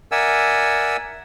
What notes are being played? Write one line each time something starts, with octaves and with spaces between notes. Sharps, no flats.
A#4 D5 E5 F#5 G#5 E6